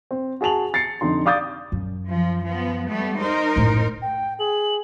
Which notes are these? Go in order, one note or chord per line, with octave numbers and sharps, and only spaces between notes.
C4
F#4 G#4 A5 F7 F#7
A6 C7 C#7
F1 D3 D#4 C6
D5 F5 D6 D#6 G6 A6
F#2
F3
F3 B3
G3 A3 B3
D#4 A#4 C5
F#1 A2
G5
G#4 F#7